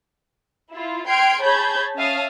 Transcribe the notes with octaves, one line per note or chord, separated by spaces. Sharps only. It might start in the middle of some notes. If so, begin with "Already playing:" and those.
E4 F4
G5 C6 F6 G#6 C7 D7
G#4 C#5 A5 B5 G6 G#6
C#4 E5 F5 A5 D#6 F6